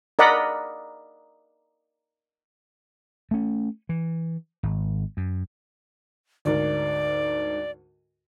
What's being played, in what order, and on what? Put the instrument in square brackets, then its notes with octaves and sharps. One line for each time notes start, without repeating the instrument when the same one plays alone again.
[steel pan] A#4 D5 D#5 F#5 B5
[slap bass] A3 C#4
E3
G#1
F#2
[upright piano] D2 G#2 A#4 [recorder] D5